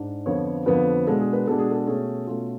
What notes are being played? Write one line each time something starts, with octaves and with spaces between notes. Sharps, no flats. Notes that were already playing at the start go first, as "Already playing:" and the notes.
Already playing: G#2 D4
F2 D3 F3 B3 C#5
F2 D3 F3 B3 B4
B2 G#3 D4 A4
G#4
B4
B2 G#3 D4 A4
G#4
A4
B2 A3 C#4 G#4
B2 A3 C#4 F4